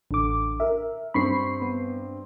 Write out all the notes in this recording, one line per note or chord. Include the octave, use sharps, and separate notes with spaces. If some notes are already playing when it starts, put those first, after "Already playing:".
A1 D3 D6
A#4 E5
G2 C4 B5 C#6 C7
B3